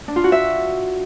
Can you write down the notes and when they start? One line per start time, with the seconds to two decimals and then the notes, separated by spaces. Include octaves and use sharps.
0.08 D4
0.16 F4
0.24 F#4
0.32 E5